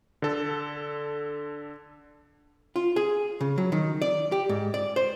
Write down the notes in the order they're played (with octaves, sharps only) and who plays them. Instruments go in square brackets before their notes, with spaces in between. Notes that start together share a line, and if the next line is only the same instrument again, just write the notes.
[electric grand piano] D3 A4
[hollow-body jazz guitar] F4
G#4
C#3
F#3
D#3
D5
G4
G#2
D5
C5